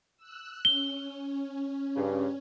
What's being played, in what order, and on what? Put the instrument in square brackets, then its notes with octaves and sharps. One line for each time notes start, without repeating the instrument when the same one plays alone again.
[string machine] E6 F#6
[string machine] C#4 [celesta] G7
[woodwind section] G2 C#3